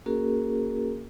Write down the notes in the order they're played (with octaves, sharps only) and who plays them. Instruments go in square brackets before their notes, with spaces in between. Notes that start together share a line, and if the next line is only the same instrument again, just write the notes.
[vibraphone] A#3 C#4 F#4 G#4 A#4